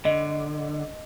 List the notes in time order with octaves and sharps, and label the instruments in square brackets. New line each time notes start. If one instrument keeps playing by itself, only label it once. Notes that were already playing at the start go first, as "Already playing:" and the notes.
[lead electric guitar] D3 [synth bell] D#5